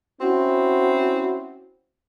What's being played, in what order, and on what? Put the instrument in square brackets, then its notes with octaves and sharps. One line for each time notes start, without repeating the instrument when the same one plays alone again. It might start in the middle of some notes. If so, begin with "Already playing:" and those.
[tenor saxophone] C4 [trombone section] C#4 E4 F#4